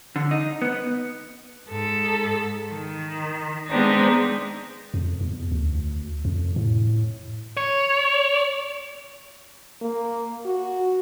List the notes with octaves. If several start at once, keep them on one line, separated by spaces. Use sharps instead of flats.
D3
D#4
B3
G#2 A4
D#3
G#3 B3 C4 D4 D#4
F2
E2
D2
F2
A2
C#5
A#3
F#4